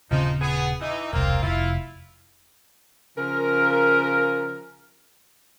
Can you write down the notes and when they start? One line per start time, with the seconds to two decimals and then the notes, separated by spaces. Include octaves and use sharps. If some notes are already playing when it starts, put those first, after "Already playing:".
0.11 D#1 C#3 F3 G#3 C4 D#4
0.41 B3 G#4
0.81 E3 D#4
1.13 E1 C2 A#3 C4 F4
1.43 F1 E4 F4
3.17 C#3 F3 A#4